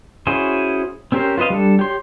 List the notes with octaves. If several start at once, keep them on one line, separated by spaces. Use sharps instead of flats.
C#4 E4 F#4 G#4 C5
C4 C#4 G4 A#4 C5
F4 B4 C5 D#5 F5
G3 D4 A4
G4 C#5 C6